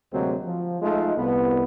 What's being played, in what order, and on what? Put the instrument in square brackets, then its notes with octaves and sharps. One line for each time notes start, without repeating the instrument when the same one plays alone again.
[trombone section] D2 C3 F#3 G#3 A#3 C4
F3
F3 G#3 A3 D#4 F4
C2 B3